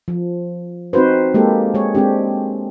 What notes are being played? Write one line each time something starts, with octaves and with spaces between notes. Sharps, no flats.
F3
C4 D#4 F#4 B4 C5
G#3 A#3 G4 A4
G#3 G#4 C#5
G#3 C4 D4 G4